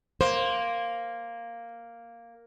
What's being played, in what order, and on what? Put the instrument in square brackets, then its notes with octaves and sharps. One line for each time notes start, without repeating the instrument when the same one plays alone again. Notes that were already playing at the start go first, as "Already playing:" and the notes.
[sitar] A#3 [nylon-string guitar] C5